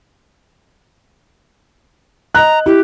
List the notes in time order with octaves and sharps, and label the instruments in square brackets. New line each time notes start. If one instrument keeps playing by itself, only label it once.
[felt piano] D#5 F#6 [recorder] A#5
[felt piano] E4 [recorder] G4